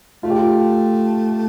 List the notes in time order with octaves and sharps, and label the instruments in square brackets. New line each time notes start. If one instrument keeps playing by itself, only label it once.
[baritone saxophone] A3 [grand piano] F4
[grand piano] G4
F4